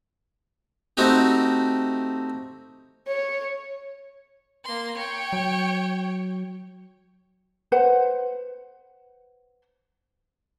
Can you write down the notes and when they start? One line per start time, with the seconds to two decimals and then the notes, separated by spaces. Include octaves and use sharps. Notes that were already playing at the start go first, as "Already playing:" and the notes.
0.97 A3 C4 D#4 F#4 G4
3.07 C#5
4.64 A#3 C6
4.98 C#5 G5
5.33 F#3
7.72 B4 C5 F#5